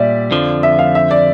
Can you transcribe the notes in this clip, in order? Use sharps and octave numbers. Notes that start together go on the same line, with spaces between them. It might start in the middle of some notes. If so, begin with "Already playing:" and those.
Already playing: A#2 G3 D5 E5
F2 D3 F3
E5
F5
E5
D5